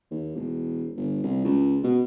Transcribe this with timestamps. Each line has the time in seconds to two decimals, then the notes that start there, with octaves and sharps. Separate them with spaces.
0.11 D#2
0.36 E1
0.97 G1
1.23 C2
1.44 C#2
1.84 B2